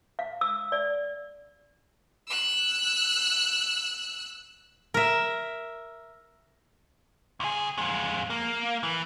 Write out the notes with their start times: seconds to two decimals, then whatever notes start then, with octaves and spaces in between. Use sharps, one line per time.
0.19 F5
0.41 E6
0.72 D5
2.27 E6 F#6
4.94 A#4 E5
7.40 C#2 G#4
7.78 F2 G#3
8.30 A#3
8.83 E3